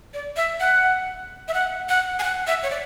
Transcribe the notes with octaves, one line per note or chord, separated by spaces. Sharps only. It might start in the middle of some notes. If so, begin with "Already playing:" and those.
D5
E5
F#5
E5
F#5
F#5
G#5
F#5
E5
C#5
D5